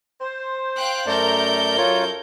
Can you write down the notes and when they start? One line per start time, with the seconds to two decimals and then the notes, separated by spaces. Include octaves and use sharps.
0.21 C5
0.76 F5 G5 F#6
1.06 F#2 A3 A4 A#4 D5 G6
1.78 F#2 F4 C#5